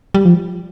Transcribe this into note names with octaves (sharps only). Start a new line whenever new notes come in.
G3
F3